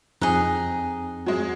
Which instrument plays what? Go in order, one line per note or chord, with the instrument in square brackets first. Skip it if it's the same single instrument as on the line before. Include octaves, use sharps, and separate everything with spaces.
[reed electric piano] F2 C4 F#6 [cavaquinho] D#4 G#4
[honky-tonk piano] F#3 G#3